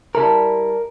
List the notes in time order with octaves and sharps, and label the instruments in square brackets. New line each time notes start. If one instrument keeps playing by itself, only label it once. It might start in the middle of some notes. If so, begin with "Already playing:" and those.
[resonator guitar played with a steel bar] G3 E4 A4 [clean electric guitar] A#4